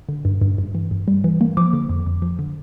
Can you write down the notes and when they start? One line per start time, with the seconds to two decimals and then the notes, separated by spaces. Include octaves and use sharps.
0.09 D3
0.25 G2
0.41 G2
0.58 G2
0.75 E3
0.91 G2
1.08 G3
1.24 E3
1.41 A#3
1.57 F3 D6
1.73 D3
1.89 F2
2.06 F2
2.22 F3
2.39 D3